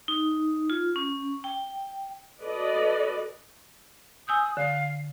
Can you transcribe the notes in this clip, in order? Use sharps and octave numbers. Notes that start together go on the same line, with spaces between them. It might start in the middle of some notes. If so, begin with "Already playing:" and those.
D#4
F4
C#4
G5
F#4 A4 B4 D5 D#5
G#5 D#6 E6 G6
D3 F5